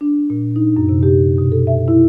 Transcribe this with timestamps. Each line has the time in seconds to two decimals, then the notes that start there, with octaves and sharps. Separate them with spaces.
0.01 D4
0.30 A#2
0.56 D#4
0.77 F#2
0.89 C3
1.03 G4
1.38 B2
1.52 A4
1.67 E5
1.88 E4